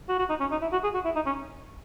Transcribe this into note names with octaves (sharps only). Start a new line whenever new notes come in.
F#4
F#4
D#4
C#4
D#4
E4
F#4
G#4
F#4
E4
D#4
C#4